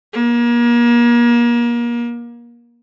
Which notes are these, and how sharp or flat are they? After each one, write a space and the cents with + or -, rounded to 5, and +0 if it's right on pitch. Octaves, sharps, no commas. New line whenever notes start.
A#3 +35